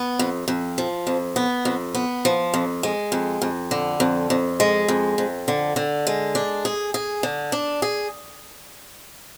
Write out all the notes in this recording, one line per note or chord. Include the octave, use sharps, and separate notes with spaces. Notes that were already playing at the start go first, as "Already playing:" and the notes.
Already playing: B3
F2
F2
F3
F2
B3
F2
B3
F3
F2
G#3
F2
F2
D3
F2
F2
G#3
F2
F2
D3
D3
G#3
D4
G#4
G#4
D3
D4
G#4